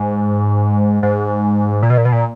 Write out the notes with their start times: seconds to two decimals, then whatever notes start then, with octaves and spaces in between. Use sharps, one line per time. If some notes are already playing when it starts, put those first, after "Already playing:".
Already playing: G#2
1.03 G#2
1.83 A#2
1.90 B2
1.98 A#2
2.05 B2
2.12 A#2